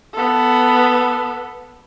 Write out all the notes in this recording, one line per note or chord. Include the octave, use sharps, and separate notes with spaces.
B3 A4